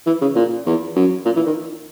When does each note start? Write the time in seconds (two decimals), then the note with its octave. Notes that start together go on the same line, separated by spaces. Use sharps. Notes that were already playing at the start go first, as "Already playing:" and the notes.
0.06 E3
0.21 C#3
0.36 A#2
0.66 E2
0.96 F#2
1.25 A#2
1.36 E3
1.46 D#3